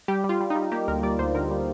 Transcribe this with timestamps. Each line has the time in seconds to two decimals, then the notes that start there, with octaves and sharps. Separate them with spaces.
0.08 G3 G4
0.24 G3
0.29 F4
0.41 G3
0.50 D#4
0.55 G3
0.72 A#3 G4
0.88 D2 A#4
1.03 G3 D5
1.19 D2 C5
1.35 D3 A#4
1.51 G3